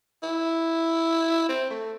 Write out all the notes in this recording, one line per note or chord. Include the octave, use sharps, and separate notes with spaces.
E4
C4
A3